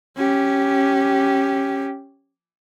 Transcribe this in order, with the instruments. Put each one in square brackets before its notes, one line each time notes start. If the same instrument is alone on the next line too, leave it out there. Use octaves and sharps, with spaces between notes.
[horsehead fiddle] C#4 G4